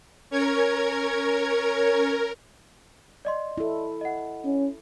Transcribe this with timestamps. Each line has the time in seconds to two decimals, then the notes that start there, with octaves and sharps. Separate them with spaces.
0.31 C#4 A#4 C#5 G#6
3.25 D5 D#5 C6
3.58 E4 A4
4.01 D#5 F#5
4.45 C#4